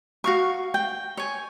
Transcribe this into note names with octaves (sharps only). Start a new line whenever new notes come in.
F#4 F5 C#6
G5
C#5 G#5